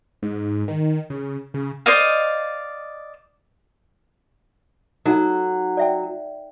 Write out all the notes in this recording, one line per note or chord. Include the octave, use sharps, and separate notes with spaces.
G#2
D#3
C#3
C#3
C5 D5 D#5 F5
F#3 D#4 A4
D5 E5 G5